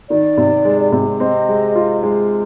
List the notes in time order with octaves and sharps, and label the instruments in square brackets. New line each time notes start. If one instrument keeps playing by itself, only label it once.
[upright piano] D#3 [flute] D5
[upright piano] C3
G#3
C3
[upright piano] C4 [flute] D#5
[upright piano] G#3
F4
G#3